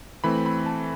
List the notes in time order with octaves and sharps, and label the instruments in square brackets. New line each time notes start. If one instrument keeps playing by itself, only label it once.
[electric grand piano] E3 A3 C4 B5
B5
A5